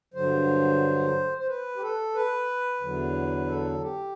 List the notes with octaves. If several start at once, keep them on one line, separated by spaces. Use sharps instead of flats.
G2 D3 F#3 C5
C5
B4
G4
A4
B4
E2 D3 F#3
A4
G4